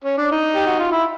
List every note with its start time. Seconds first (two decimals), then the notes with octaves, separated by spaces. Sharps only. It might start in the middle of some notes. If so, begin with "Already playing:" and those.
0.04 C#4
0.18 D4
0.32 D#4
0.55 G4
0.67 F#4
0.79 F4
0.92 E4